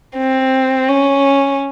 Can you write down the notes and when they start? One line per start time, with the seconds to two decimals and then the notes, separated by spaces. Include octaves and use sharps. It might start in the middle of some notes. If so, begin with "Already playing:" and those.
0.17 C4
0.88 C#4